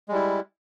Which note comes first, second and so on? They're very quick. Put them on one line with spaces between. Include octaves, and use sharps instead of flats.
G#3 G3 E4